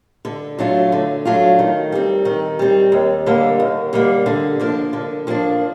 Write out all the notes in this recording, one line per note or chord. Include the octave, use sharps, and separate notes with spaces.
D3
F#3 A3 D4 F4
D3
F#3 A3 D4 F4
D#3
G3 C4
D#3
G3 C4
D#2
D3 G3 A#3
D#2
D3 G3 A#3
D3
F3 A#3 D4
D3
F3 A#3 D4